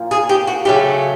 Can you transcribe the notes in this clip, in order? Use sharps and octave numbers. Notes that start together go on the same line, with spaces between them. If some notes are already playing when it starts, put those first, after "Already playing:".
Already playing: A#2 F3
G#4
G4
F#4
C#3 F#3 A3 G4